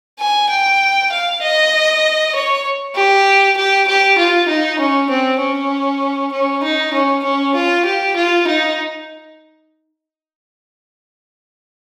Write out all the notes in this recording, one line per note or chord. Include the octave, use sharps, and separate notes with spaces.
G#5
G5
F5
D#5
C#5
G4
G4
G4
F4
D#4
C#4
C4
C#4
C#4
D#4
C#4
C#4
F4
G4
F4
D#4